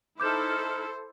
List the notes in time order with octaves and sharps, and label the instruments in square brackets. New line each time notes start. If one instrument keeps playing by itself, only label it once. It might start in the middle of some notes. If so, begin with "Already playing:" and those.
[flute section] D#4 F6 [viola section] E4 A4 [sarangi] C5 [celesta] D6 G6 E7